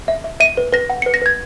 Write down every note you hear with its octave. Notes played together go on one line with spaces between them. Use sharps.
E5
E5
E5 D#7
B4
B4 A#6
F#5
B4 C#7
A#6
B4 G#6